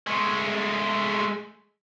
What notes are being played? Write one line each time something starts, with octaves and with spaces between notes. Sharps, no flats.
G#3 A3